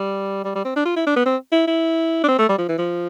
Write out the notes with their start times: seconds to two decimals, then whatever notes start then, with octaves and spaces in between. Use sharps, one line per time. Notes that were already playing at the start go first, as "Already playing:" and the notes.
Already playing: G3
0.45 G3
0.55 G3
0.65 C4
0.76 D4
0.85 F4
0.96 E4
1.07 D4
1.16 B3
1.26 C4
1.52 E4
1.67 E4
2.24 D4
2.28 C4
2.39 A3
2.49 G3
2.58 F3
2.69 E3
2.78 F3